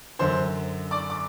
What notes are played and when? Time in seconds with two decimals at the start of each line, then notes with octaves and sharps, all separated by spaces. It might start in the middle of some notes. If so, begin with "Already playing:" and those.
0.19 F#2 D3 C5 C6
0.91 D5 D6
1.10 D6